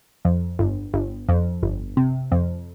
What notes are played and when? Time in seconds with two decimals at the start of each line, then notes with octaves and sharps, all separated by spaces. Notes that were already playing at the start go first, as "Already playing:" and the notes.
0.25 F2
0.59 G1
0.94 G1
1.29 F2
1.63 G1
1.97 C3
2.32 F2